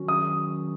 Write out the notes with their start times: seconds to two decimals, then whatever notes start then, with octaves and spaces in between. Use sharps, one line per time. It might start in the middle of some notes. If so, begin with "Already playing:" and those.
Already playing: D#3 F#3 C#4 F#4
0.08 D#6